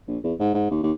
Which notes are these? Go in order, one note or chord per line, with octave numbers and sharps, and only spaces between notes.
A#1
E2
G#2
G#2
D#2
D#2